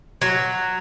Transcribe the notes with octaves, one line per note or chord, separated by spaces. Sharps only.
F#3